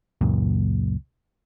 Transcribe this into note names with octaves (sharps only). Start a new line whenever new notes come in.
C#2 F#2 A#2